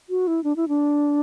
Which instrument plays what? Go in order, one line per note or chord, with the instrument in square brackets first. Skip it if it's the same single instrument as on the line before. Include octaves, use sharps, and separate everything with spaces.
[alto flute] F#4
E4
D4
E4
D4